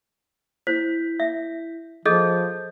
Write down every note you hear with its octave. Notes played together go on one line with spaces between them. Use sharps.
E4 C5 G6 B6
E5
F3 G#4 A4 D#5 G6